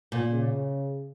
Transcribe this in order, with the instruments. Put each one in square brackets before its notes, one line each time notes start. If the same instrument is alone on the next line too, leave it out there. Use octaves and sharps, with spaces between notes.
[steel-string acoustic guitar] A#2
[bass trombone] C#3